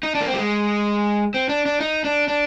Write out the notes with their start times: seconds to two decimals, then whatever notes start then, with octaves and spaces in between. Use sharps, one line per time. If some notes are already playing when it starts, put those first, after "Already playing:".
0.03 D#4
0.15 D4
0.21 A#3
0.27 C4
0.34 G3
0.38 G#3
1.34 C4
1.49 D4
1.66 D4
1.80 D#4
2.05 D4
2.28 D4